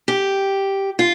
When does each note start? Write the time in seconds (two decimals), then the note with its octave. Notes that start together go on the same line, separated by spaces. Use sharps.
0.08 G4
0.99 F4